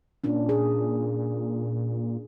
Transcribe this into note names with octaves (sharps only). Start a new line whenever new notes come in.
A#2 C#4 D4
G#4